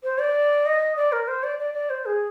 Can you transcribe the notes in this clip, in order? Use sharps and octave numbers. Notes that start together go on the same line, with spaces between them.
C5
D5
D#5
D5
A#4
C5
D5
D5
D5
C5
G#4